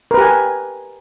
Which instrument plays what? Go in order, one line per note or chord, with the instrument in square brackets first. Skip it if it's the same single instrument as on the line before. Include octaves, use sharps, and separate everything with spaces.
[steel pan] A#4
B4
G4
G#5